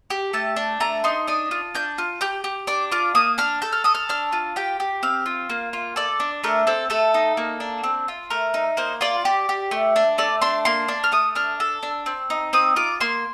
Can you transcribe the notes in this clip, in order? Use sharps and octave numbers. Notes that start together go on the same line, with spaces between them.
G4
A3 A5
D4
A3 A#5
D#4 C6
D4 D#6
F4
D4 G6
F4
G4 G6
G4
D4 D6
F4 D6
A#3 D#6
D4 F6
A4 G6
F6
A4 D#6
F6
D4 F6
F4
G4 G5
G4
C4 F5
F4
A#3
F4
A4 D5
D4
A3 A#4
C4 A4
A3 A4
D#4
A#3
D4
C4
F4
A3 A#4
D#4
A#3 C5
F4 D5
G4
G4
A3
D4
A3 D5
D4 C6
A#3 C6
D4
F6
A3 D#6
D4 F6
A4
D4
C4
D#4
C4 D#6
F4 D6
A#3 C6